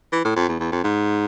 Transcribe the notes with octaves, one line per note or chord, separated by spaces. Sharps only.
E3
A2
F2
E2
E2
F2
G#2